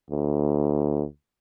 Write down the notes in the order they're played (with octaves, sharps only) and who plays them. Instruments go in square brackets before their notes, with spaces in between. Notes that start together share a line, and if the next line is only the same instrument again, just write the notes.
[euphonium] D2